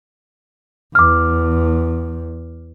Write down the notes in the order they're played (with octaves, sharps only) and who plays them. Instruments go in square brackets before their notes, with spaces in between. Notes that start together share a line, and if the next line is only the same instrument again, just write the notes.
[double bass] E2 [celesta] D6 F6